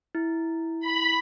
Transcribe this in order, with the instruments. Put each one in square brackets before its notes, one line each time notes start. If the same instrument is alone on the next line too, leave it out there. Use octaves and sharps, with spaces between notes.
[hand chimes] E4
[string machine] B5